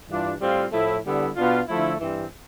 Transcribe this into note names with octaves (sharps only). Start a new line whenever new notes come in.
G2 E3 G3 D4 F4
A2 G3 C4 F4
A2 F3 A3 E4
D3 G3 B3 E4
B2 B3 D4 F4
D3 F3 A3 E4
G2 E3 G3 C4